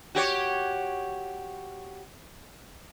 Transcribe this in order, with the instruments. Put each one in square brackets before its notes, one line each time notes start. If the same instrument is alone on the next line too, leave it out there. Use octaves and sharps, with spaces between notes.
[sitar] F#4 G4 C#5